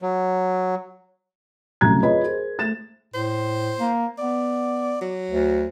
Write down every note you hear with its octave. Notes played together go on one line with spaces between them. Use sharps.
F#3
C2 C#3 F#3 A3 A#5 G#6
F4 G#4 B4 C#5 D#5 B5
G#4 A#4 C5
A3 A6 E7
A2 C5
A#3
B3 D5
F#3
D2